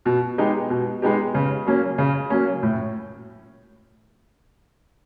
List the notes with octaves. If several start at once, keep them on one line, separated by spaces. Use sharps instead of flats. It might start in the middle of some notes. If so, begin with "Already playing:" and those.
B2
G#3 B3 D#4 G4
B2
G#3 B3 D#4 G4
C#3
F#3 A#3 C#4
C#3
F#3 A#3 C#4
A2